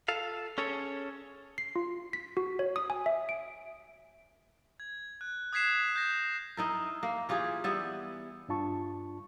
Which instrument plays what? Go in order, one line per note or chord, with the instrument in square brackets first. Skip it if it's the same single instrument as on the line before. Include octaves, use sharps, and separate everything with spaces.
[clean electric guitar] F4 A4 F5
C#4 G#4 A4 C#5
[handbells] C7
F4
B6
F#4
C#5
D#6
G#5
E5
D7
[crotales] G#6
F#6
D#6 F#6 G#6 B6 C7 E7
G6 A#6 E7
[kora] D#4 E4 A#4
A#3
E3 F4 G4 G#4
G3 B3 E4
[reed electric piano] G2 D4 F4 A5 C#6